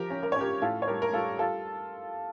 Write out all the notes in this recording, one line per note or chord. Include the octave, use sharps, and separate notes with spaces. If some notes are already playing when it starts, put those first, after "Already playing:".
Already playing: F3 G4 A#4
C#4
A#4
C#5
C#4 G4 A#4
A2 F4 A4
C#5
G3 G4 A#4
A#4
G3 F4 A4
G3 F4 A4